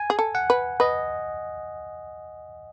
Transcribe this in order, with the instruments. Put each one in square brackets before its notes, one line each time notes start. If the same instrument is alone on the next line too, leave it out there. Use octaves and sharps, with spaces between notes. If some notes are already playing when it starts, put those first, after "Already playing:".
Already playing: [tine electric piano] G#5
[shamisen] G#4
A4
[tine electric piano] F#5
[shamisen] B4
[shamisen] B4 [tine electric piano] D#5